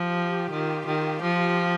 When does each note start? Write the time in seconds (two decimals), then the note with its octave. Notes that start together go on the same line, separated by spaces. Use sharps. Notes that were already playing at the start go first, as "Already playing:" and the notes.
Already playing: F3 G4
0.15 F4
0.51 D#3 G4
0.87 D#3
1.22 F3